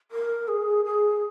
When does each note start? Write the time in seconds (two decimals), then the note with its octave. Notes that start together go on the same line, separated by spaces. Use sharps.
0.11 A#4
0.48 G#4
0.85 G#4